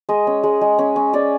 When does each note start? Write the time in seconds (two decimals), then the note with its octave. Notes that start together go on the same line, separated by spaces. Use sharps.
0.09 G#3 D#5
0.27 C#4
0.43 G#3
0.61 G#3
0.79 C#4
0.96 C#4
1.13 C#4 D5